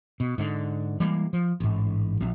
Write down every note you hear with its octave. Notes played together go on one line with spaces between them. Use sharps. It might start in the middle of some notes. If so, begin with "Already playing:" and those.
B2
G#2 D3
E3 G3 G#3 A#3
F3
A1 G#2
A#1